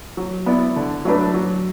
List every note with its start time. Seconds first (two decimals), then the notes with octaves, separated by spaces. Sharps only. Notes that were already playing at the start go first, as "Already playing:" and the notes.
0.17 F#3
0.46 B3 E4 D5
0.76 D3
1.05 F#3 A3 D4 B4
1.34 F#3